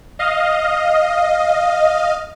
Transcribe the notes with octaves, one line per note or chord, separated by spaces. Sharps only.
D#5 F5